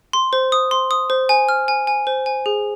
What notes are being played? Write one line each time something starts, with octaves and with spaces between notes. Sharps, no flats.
C6
C5
D#6
C6
D#6
C5
G#5
F6
G#5
G#5
C5
G#5
G#4